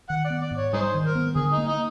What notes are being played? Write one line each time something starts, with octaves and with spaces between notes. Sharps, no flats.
D#3 F#5
D5
B3
D5
G#2
C#5
G3 D#4 G#4 C5
D#3
A#4
B3
D3 G#4
D#4
A#3
D#4